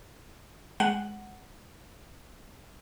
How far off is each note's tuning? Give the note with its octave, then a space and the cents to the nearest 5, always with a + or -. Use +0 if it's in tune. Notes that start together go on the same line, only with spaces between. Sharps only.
G#3 +0 F#5 +0